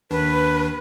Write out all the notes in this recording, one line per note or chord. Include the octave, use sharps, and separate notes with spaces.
D#2 D#3 D4 B4